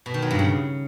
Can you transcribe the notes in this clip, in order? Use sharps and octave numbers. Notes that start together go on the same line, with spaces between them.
B2
D#3
F#3
G2
C#3